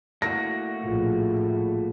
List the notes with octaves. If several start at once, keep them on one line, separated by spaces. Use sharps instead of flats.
A3 A#3 E4 F#4 A#6
A#1 A2 F4 G#4